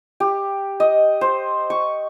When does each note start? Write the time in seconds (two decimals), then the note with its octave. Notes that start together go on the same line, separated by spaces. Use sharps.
0.20 G4
0.80 D#5
1.21 C5
1.70 C#6